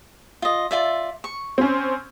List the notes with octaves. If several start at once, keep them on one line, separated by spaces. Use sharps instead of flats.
F4 D#5
F4 D5 E5
C#6
C4 C#4